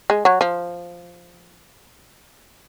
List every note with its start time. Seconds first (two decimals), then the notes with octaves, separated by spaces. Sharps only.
0.10 G#3
0.25 F#3
0.41 F3